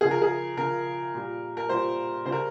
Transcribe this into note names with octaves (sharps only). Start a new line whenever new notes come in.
C#3 F3 G#4
A#4
G#4
C#3 F3 A#4
A#2 G3
A#4
A#2 G3 C5
C#3 G3 C5
A#4